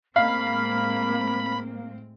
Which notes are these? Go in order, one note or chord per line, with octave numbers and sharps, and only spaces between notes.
A2 G#3 A#3 C4 F5 B5